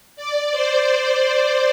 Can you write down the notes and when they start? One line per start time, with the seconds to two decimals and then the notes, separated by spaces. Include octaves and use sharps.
0.16 D5
0.51 C5